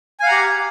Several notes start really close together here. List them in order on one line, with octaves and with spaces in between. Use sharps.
G#5 F5 F#5 A#5 G4